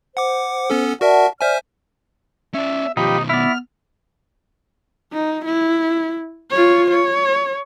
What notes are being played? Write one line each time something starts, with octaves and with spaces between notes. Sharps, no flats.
C5 F#5 D6
B3 C#4 A4
F#4 A#4 D5 E5 F#5 A5
C5 D5 E5 G#5 F6
C#4 D5 E5
B2 D#3 F3 D#4 G4 G5 B5
B3 E4 D5 F6
D#4
E4
F4 C#5
C#5